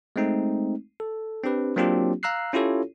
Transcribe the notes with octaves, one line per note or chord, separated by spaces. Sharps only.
G#3 A3 C4 D#4
A4
C4 D4 G4 B4
F#3 A#3 C4 D4 F4 G4
F5 A#5 E6 F#6 C7
C#4 E4 F4 G4 A4 C#5